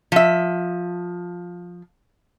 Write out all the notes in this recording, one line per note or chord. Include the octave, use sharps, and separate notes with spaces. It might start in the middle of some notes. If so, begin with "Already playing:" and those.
F3 E5